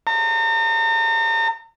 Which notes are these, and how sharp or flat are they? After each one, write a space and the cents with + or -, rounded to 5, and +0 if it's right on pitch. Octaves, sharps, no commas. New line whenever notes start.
A#5 -40